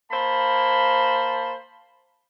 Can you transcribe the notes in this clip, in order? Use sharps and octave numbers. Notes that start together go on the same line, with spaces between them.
A#3 C5 A5 B5